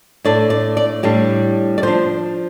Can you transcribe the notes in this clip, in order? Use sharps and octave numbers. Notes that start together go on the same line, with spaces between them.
A2 A3 D4 D5
D5
D5
A2 G3 D4 G4
D5
F3 D4 C5